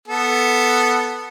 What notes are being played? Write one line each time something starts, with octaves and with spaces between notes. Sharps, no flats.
B3 A4